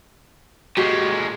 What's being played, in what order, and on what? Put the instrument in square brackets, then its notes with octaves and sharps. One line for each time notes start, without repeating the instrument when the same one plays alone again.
[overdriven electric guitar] A#2 G#3 [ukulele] F#4 G4